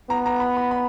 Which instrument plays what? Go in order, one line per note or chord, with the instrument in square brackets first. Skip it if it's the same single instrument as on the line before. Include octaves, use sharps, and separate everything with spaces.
[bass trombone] B3 [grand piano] A#5
[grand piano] A#5
B5
B5
B5